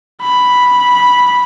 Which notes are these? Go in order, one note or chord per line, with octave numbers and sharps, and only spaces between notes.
B5